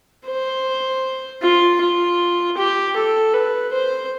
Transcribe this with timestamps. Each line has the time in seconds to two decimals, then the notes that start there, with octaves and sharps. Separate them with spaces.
0.26 C5
1.42 F4
1.81 F4
2.58 G4
2.96 A4
3.34 B4
3.72 C5